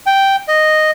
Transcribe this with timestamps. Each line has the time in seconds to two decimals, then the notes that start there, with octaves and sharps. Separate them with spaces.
0.07 G5
0.48 D#5